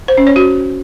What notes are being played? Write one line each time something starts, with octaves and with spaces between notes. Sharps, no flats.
C5
C#4
C#5
F#4